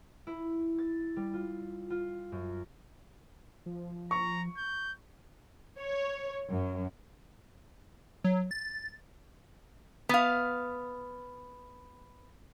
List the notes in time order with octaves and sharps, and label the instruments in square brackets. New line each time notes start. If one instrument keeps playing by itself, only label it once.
[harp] E4
A6
G3
F4
F4
F#2
[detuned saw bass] F3
[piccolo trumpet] A#5 [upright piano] C#6
[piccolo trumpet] G6
[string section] C#5
F#2
[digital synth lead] F#3
A6
[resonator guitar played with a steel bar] B3 F5